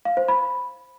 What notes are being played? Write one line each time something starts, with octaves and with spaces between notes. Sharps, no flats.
F5
C5
B5